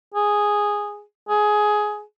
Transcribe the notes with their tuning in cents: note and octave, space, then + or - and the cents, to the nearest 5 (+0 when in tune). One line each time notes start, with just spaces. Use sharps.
G#4 -5
G#4 +15